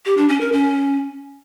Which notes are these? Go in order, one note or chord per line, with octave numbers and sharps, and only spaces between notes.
G4
D4
C#4
A#4
C#4